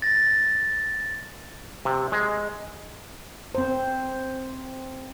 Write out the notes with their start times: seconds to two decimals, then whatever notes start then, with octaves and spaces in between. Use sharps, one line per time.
0.02 A6 A#6
1.85 C3
2.12 G#3
3.55 C4 C5